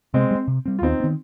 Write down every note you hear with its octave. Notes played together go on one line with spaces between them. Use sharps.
C3 G#3 C4
G3
C4
C3
G3 C4
F4
D#2 C4 D#4
D#3 B3